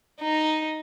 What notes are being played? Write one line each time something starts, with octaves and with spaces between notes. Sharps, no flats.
D#4